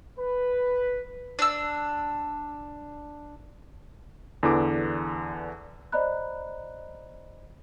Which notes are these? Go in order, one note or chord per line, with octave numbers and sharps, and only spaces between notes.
B4
D4 E6
E2 D3 E3 D6
C5 D5 D#5 A#5 B5 F#6